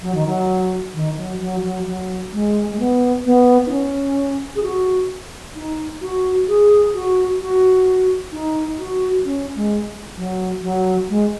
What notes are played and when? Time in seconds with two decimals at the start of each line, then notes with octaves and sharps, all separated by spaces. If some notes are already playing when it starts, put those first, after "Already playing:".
0.02 F#3
0.15 D#3
0.27 F#3
0.94 D#3
1.17 F#3
1.40 F#3
1.63 F#3
1.86 F#3
2.33 G#3
2.72 G#3
2.80 B3
3.25 B3
3.66 D#4
3.71 C#4
4.56 G#4
4.63 F#4
5.55 D#4
6.01 F#4
6.48 G#4
6.94 F#4
7.41 F#4
8.32 D#4
8.79 F#4
9.25 C#4
9.56 G#3
10.17 F#3
10.62 F#3
11.09 G#3